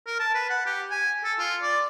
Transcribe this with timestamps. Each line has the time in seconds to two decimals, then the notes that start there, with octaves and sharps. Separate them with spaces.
0.07 A#4
0.20 A5
0.34 B4
0.50 F#5
0.66 G4
0.91 G#5
1.24 A4
1.39 F4
1.62 D5